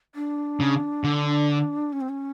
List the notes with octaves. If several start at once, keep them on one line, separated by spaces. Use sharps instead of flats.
D4
C#3
D3
C#4
C4
C#4